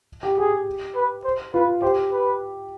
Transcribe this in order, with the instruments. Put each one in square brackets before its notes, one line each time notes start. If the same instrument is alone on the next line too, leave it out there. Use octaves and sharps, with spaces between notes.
[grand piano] G4
[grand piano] G4 [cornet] G#4
[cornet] B4
C5
[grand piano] F4 [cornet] B4
[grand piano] G4 [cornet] C5
[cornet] B4